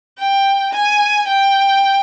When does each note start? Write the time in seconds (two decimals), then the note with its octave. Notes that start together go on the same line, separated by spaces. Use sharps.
0.18 G5
0.73 G#5
1.28 G5